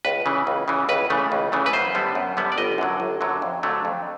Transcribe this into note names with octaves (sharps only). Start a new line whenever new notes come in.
C#2 B4
C#3 E3
C#2
C#3 E3
C#2 B4
C#3 E3 A3
C#2
C#3 E3 A3
B4
F#2 C5
D3 G3 B3
F#2
D3 G3 B3
D5
G1 D#5
F#2 D3 F#3
G1
F#2 D3 F#3
F2
D3 F#3 A3
F2